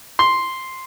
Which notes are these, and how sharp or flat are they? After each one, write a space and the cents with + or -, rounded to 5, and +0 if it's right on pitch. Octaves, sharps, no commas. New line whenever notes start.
C6 +0